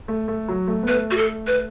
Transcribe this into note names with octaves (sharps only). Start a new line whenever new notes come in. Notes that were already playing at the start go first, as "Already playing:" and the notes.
A3
A3
F#3
A3
B3
A3 B4
F#4
A4
B4